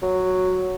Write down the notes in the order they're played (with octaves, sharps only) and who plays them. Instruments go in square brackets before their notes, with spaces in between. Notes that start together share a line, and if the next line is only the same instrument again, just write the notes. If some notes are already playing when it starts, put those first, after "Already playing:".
[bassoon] F#3